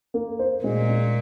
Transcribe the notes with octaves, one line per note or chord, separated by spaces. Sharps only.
A#3
C5
A#2 G#3
G#3